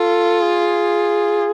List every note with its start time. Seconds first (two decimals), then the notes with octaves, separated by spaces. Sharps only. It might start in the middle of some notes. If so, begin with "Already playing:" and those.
Already playing: F4 A4
0.42 G#4